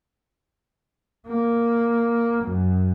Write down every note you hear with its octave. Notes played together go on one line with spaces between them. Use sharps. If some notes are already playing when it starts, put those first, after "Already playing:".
A#3
F#2